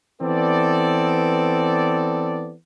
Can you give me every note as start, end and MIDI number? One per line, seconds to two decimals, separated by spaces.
0.22 2.53 52
0.22 2.53 59
0.22 2.53 60
0.22 2.53 69
0.22 2.53 74